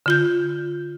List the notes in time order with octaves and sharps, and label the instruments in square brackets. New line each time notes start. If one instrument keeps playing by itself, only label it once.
[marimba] D3 F4 G6